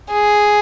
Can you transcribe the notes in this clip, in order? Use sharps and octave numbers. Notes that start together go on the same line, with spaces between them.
G#4